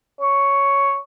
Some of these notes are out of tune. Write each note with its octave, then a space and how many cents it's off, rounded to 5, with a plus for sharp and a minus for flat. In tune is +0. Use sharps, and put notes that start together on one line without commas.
C#5 +5